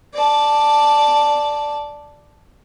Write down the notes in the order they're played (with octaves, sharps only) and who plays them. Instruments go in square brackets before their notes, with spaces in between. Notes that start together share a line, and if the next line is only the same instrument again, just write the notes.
[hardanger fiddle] D5 A5